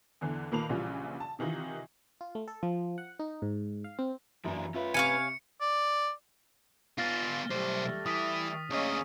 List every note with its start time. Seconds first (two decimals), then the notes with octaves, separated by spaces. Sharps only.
0.21 E2 D3 E3
0.52 A#2 D#3 A#3 B4 A5 F7
0.69 A#1 A#2 C#3 E3 F3 G3
1.20 A5
1.39 C3 D#3 E3 D#4 F4
2.21 F4
2.35 A3
2.48 A4
2.63 F3
2.98 F#5
3.19 D#4
3.42 G#2
3.84 F5
3.99 C4
4.44 F#2 E3 A#3 D4
4.74 C#4 F4 B4 E5
4.94 C3 C#5 F5 G#5 C#7
5.61 D5
6.98 B3 F4 F6 A6 A#6
7.51 B1 G3 A3 C5
8.06 E3 D#6 B6 D#7
8.70 D2 A#3 C#4 G#4 D#5